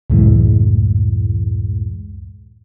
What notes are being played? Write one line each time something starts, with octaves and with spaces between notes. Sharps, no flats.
C#2 F#2 A2 E3 G#3